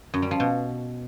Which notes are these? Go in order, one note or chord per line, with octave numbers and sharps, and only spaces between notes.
F#2
G3
F3
B2